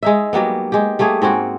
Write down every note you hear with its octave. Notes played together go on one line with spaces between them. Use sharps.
G#3 D#4 E5
F#3 G3 A#3 B3
G#3 G4
G3 A3 A#3 G#4
G#2 C4 C#4 F#4